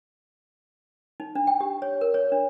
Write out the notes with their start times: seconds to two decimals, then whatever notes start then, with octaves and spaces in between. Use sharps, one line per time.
1.20 D#4
1.35 D4
1.47 G5
1.61 G4
1.82 C#5
2.01 A#4
2.14 C#5
2.32 D4